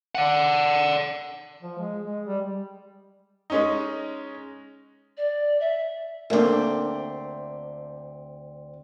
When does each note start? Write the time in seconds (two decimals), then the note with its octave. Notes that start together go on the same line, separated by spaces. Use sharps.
0.15 D5 F#5
1.62 F3
1.78 G#3
2.04 G#3
2.27 G3
3.50 G#3 C#4 D#4
5.17 D5
5.60 E5
6.30 D2 A3 A#3 C4 D4